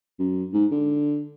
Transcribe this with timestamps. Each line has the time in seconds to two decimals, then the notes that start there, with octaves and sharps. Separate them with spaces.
0.19 F#2
0.53 G#2
0.71 D3